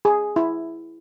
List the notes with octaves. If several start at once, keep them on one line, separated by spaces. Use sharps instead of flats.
G#4
E4